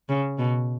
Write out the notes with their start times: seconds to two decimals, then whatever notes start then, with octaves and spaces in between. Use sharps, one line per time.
0.09 C#3
0.39 B2